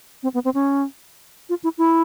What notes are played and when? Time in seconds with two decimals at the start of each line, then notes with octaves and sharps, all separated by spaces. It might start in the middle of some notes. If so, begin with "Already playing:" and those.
0.23 C4
0.34 B3
0.45 C4
0.54 C#4
1.49 F4
1.64 E4
1.78 E4